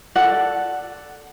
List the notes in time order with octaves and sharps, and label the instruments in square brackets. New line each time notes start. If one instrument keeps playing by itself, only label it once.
[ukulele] A4 D5 F#5